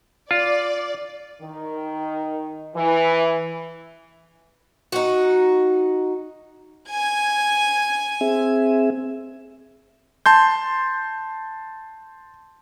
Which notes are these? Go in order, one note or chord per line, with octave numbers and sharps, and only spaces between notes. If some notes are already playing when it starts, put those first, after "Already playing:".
F4 D5
D#3
E3
D#4 F#4
G#5 G#6
C4 G#4 E5
A5 C6 G6